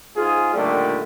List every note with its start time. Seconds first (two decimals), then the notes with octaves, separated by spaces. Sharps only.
0.16 G#2 F4 G#4
0.53 A#2 D3 D#3 G3 A3